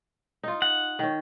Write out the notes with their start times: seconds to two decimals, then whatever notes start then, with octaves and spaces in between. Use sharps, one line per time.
0.43 D#4 F4
0.62 F#5
0.99 D#3 C#4